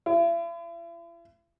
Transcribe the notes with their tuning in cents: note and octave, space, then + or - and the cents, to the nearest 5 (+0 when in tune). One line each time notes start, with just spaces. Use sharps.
E4 +45